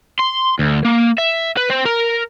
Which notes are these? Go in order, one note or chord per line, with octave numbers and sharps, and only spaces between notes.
C6
D2
A#3
E5
B4
C4
A#4